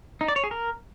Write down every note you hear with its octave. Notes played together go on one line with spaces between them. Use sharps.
D#4
D5
C#5
G#4
A#4